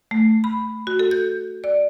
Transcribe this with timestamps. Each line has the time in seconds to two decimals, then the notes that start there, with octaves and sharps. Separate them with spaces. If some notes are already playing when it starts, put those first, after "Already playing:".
0.11 A3
0.44 B5
0.87 F#4
0.99 A4
1.11 G6
1.64 D5